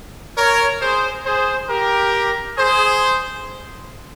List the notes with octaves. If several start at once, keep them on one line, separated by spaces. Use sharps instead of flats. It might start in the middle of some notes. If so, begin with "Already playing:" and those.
A#4 C#5
G#4 C5
G#4 C5
G4 A#4
G#4 C5